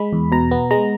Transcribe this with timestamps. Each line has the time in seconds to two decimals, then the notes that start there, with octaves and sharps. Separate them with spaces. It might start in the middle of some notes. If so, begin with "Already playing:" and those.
Already playing: G#3 B5
0.13 E2
0.32 B2 A#5
0.51 B3
0.71 G#3 A#5